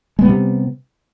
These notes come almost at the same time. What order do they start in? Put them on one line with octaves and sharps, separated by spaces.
G#3 B3 G3 C3